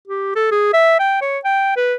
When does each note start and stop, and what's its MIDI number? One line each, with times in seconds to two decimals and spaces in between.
0.08 0.33 67
0.36 0.48 69
0.52 0.73 68
0.74 0.97 76
1.00 1.18 79
1.22 1.39 73
1.45 1.75 79
1.77 1.95 71